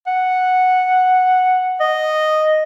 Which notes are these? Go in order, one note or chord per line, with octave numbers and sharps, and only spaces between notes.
F#5
D#5